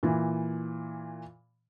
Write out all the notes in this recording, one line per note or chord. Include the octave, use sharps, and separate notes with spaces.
A#2 E3